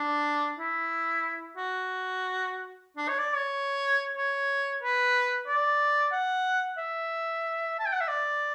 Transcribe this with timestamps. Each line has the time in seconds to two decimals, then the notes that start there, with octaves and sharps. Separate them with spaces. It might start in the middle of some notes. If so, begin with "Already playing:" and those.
Already playing: D4
0.59 E4
1.57 F#4
2.97 D4
3.09 C#5
3.19 D5
3.36 C#5
4.17 C#5
4.83 B4
5.48 D5
6.12 F#5
6.78 E5
7.79 A5
7.86 G5
7.93 F#5
8.01 E5
8.08 D5